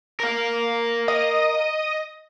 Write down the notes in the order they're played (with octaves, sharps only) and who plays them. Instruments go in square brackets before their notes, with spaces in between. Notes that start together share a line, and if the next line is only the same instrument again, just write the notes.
[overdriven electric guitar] A#4 F5
[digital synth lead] D#5